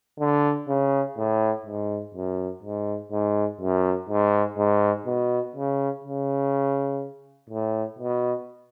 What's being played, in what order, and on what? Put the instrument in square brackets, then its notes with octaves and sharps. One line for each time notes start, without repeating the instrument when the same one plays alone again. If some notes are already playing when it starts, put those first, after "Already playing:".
[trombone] D3
C#3
A2
G#2
F#2
G#2
G#2
F#2
G#2
G#2
B2
C#3
C#3
A2
B2